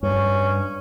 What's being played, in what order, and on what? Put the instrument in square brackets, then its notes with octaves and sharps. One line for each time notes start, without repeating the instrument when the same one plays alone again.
[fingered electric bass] G2 [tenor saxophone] C#4